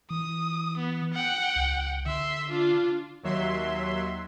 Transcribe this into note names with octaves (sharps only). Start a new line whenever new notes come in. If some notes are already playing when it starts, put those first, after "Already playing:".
E3 D#6
B3
F#5 G5
C#2
D3 E5 C6
D4 F4
D#2 F#3 E5 C6